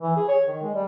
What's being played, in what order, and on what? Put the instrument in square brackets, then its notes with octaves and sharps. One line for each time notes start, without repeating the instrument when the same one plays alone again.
[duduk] E3
G#4
C#5
D#3
G#3
G3